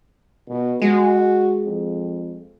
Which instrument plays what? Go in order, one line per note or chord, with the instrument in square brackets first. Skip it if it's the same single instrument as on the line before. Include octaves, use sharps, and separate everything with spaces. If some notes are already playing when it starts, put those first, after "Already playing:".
[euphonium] B2
[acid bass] G#3 [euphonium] F#4
[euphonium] F2